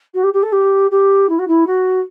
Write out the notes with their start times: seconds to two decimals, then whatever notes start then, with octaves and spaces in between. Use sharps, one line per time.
0.14 F#4
0.23 G4
0.33 G4
0.42 A4
0.52 G4
0.91 G4
1.29 E4
1.38 F#4
1.47 E4
1.66 F#4